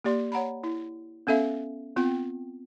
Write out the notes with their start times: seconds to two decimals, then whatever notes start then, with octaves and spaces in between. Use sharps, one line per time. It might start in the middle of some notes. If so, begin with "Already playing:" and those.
0.04 A#3 G4 D5 C6
0.32 C#5 F#5 A#5 B5
0.64 E4
1.27 B3 C#4 A4 E5 F5
1.96 B3 C4 F4 G5